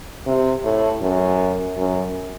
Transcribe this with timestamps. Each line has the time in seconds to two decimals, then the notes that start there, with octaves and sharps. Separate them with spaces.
0.26 C3
0.64 A2
1.01 F#2
1.76 F#2